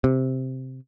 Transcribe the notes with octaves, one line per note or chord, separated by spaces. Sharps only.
C3